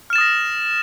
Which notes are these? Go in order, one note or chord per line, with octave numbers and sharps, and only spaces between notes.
D#6 F6 A6 A#6 E7